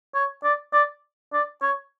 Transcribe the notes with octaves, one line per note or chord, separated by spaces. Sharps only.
C#5
D5
D5
D5
C#5